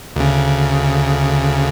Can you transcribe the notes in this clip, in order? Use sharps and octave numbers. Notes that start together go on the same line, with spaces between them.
D2 C#3